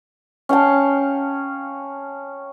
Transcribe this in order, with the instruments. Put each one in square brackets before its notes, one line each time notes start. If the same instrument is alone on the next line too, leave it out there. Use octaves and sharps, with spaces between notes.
[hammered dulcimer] C#4 F5 G5 A5